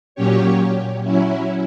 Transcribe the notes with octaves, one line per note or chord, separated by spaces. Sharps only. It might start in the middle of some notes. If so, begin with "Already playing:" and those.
A#2 F#3 C#4 G4 C#5
F#3 C#4 E4